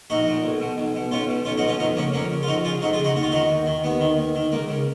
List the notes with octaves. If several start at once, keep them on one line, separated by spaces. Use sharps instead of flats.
A#1 D#4 F#4
A#2
B1
B2
B1
B2
B1 C#4 F4
B2
B1 C#4 F4
D#4 F#4
B2
C#4 F4
F2 B3 D#4
C#3 A#3 C#4
F2 A#3 C#4
C#3
F4
F2 D#4 F#4
C#3 F4 G#4
F2 D#4 F#4
F4 G#4
C#3
D#4 F#4
D#2 F#4
F4
D#3 D#4 F#4
D#2
D#3
D#2 B3
D#3
D#2
D#3
C#2 A#3
C#3